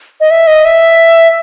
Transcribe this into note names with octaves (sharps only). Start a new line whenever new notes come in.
D#5
E5
D#5
E5